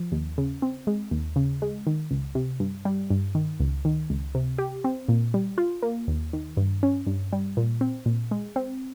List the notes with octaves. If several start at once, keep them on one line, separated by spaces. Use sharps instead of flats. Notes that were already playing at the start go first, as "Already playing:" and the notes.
Already playing: F3
D#2
C#3
C4
G#3
D#2
C#3
G#3
D#3
C#2
C3
G2
G3
G2
D#3
C#2
D#3
C#2
C3
G4
C4
A#2
G3
F4
A#3
D#2
D#3
G2
C#4
G2
G3
A#2
C4
A#2
G#3
C4